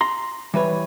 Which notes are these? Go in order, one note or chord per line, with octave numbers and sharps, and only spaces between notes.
A#5 C6
E3 G3 B4 C#5